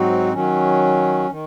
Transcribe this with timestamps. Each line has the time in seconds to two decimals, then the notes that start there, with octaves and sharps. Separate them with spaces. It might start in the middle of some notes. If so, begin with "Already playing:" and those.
Already playing: G#2 F#3 C4 D#4 F#4
0.33 D#3 F#3 C#4
1.30 D#3